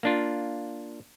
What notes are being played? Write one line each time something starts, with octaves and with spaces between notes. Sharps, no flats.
A#3 D4 F4